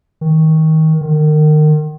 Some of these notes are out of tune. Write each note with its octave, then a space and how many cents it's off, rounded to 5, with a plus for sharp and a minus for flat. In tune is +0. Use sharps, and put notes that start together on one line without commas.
D#3 +25
D#3 -30